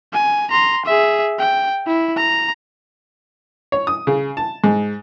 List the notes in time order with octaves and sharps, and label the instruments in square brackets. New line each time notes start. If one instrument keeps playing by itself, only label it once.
[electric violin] G#5
A#5 C6
G#4 E5
G5
E4
A#5
[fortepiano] C#5
D#6
C#3
A5
G#2